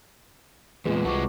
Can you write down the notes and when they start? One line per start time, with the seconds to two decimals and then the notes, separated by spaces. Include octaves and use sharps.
0.85 E2 A#2 G#3 C4 F4 B4
1.05 C2 G#3 F#4 A5 C#6 D6